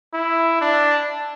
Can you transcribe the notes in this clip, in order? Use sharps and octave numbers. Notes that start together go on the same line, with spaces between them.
E4
D4